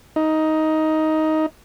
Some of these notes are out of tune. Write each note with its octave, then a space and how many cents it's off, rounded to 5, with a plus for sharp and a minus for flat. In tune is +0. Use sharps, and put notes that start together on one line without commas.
D#4 +10